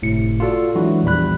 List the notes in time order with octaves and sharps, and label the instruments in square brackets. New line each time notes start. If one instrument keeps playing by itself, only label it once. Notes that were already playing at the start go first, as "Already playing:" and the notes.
[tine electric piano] G1 A2 C3 C#7
F4 F#4 A4 D5
E3 F#3 G#3 D4 E4 F#4
A#1 E2 G3 B5 F#6